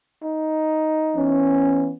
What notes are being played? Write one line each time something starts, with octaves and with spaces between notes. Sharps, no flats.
D#4
E3 B3 C#4